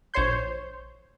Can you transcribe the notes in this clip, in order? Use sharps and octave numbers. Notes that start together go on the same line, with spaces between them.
A#1 C5 C#5 C6 G6